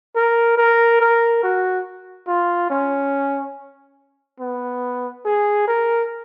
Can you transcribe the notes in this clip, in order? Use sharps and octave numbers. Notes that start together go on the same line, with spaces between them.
A#4
A#4
A#4
F#4
F4
C#4
B3
G#4
A#4